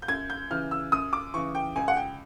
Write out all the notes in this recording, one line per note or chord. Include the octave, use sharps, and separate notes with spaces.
G6
F#2 G#6
G6
C#3 E3 F6
E6
F#2 D#6
D6
C#3 E3 C#6
G5
C#2 G#5
F#5
G5